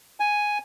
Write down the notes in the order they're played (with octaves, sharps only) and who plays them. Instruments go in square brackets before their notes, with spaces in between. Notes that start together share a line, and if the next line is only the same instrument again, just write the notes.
[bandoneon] G#5